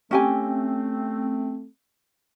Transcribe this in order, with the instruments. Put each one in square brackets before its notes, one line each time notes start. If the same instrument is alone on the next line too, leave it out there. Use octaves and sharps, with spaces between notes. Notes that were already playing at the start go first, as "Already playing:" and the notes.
[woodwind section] A3 C4 [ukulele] C#4 G4 G#5